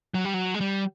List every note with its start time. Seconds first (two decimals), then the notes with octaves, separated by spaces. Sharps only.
0.14 F#3
0.25 G3
0.34 F#3
0.54 G#3
0.60 G3